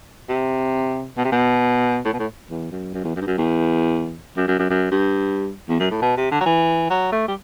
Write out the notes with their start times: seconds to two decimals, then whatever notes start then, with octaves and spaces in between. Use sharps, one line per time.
0.29 C3
1.17 B2
1.25 C3
1.32 B2
2.05 A2
2.13 B2
2.19 A2
2.50 E2
2.72 F#2
2.94 F#2
3.04 E2
3.16 F#2
3.22 G2
3.27 F#2
3.38 E2
4.37 F#2
4.48 F#2
4.59 F#2
4.70 F#2
4.92 G2
5.69 E2
5.79 F#2
5.91 A2
6.02 B2
6.17 C3
6.32 D3
6.41 F#3
6.46 E3
6.90 F#3
7.12 A3
7.28 G3